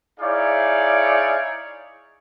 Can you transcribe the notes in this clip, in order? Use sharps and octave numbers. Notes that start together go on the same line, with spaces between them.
D#4 E4 G#4 C#5 D5 F5